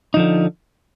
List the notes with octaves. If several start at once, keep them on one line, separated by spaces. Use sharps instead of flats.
D3 F3 D#4